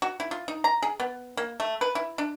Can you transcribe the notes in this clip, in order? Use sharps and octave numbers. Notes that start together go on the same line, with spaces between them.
F#4
E4
F4
D#4
A#5
G#4
B3
A#3
A3
B4
E4
D4